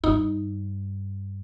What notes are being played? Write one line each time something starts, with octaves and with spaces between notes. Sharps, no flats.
G2 D#4